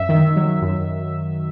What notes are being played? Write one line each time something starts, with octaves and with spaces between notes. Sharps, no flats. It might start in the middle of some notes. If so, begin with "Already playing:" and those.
Already playing: F#2 E5
D#3
F#3
F#2